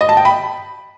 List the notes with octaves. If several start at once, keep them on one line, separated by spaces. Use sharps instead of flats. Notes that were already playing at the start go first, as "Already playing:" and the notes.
D#5
A5
G5
B5